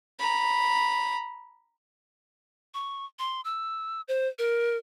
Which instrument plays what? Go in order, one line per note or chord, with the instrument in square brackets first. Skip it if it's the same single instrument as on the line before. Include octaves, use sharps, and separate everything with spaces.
[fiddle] A#5 B5
[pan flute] C#6
C6
E6
C5
A#4